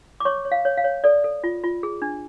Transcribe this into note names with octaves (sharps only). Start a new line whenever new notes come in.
D6
C#5 C#6
C#5
F5
C#5
F5
C#5
A4 D5
A4
F4
F4
G#4
D4